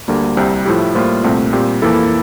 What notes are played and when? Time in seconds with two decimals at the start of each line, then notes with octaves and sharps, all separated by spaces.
0.08 D2 D3 G3 A#3
0.37 C2 C3 G3 C4
0.66 A2 F3 A3 E4 G4
0.95 A2 G3 A#3 F4 C5
1.24 C2 A#2 A3 C4
1.53 A#2 G3 C4 G4
1.82 F2 E3 A#3 E4 A4